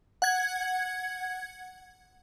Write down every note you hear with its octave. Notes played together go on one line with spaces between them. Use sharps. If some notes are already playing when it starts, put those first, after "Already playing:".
F#5 G#6